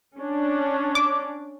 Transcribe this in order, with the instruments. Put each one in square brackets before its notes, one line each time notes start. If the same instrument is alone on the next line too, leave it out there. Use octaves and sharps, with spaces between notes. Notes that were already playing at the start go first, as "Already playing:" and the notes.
[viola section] C#4 D4
[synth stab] D6